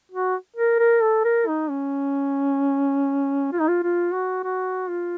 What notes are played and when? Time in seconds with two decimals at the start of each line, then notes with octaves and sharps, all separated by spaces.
0.11 F#4
0.56 A#4
0.79 A#4
1.02 A4
1.25 A#4
1.47 D#4
1.70 C#4
3.52 F4
3.60 D#4
3.68 F4
3.83 F4
4.13 F#4
4.44 F#4
4.89 F4